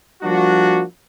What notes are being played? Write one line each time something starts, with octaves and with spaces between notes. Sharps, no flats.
F3 G3 A#3 D4 F#4